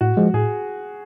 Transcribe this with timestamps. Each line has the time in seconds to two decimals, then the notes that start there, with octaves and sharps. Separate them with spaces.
0.01 A2 F#4
0.17 F3 G#3
0.34 A2 G#4